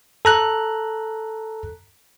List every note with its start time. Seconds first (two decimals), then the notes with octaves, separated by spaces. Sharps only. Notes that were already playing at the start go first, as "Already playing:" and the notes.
0.25 A4 A#5 F#6